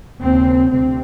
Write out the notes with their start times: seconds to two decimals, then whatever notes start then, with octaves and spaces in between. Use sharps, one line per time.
0.20 D#2 C#3 C4
0.69 D2 C3 C4